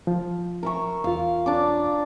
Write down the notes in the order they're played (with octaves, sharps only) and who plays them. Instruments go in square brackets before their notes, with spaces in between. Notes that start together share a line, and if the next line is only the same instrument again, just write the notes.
[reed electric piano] F3
[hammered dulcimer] A#4 E5 C#6
[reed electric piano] E2 F4 [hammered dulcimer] F5
[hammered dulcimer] D4 D5 D6